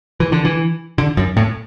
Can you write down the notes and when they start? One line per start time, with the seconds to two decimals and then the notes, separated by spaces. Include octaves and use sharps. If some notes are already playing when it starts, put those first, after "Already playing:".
0.20 E3
0.32 D3
0.45 E3
0.98 D3
1.17 F#2
1.37 A2